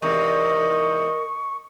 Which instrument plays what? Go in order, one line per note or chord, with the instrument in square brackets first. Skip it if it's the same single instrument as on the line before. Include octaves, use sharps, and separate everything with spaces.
[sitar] E2 G#2 C3 [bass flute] A#4 [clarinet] D#5 [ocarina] C#6